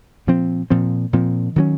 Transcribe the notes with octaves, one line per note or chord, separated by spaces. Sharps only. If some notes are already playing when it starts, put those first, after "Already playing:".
A#2 F3 C4
A#2 F3 C4
A#2 F3 C4
D#3 F#3 A#3 C#4